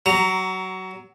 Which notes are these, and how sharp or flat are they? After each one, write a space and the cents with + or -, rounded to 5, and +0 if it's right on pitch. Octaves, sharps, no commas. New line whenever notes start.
F#3 +20 A#5 -5